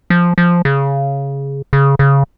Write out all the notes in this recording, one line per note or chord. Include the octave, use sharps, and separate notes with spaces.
F3
F3
C#3
C#3
C#3